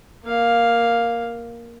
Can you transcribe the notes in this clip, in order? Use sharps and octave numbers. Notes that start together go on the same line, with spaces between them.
A#3 F5